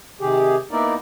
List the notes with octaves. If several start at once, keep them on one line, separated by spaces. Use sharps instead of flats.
C3 D#3 G4 G#4
A#3 B3 D#4 E4 A#4 D5